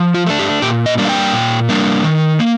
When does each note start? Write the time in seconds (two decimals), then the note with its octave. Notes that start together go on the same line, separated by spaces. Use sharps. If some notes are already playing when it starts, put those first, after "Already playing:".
Already playing: F3
0.14 F4
0.27 A3 D4
0.39 G4
0.62 A#2 G4
0.86 D#5
0.98 G3 A#3 D4
1.05 F5
1.09 G5
1.33 A#2
1.69 G3 A#3 D4
2.04 D#3
2.39 A#3